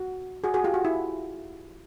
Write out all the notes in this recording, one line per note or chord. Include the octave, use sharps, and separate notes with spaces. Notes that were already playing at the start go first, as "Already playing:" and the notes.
Already playing: F#4
F#4 G#4
F#4 G#4
F4 G4
F#4
E4